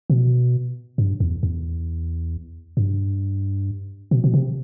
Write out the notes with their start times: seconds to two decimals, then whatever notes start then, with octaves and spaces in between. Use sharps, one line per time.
0.10 B2
0.98 G2
1.20 E2
1.43 E2
2.77 G2
4.11 B2
4.24 B2
4.34 C3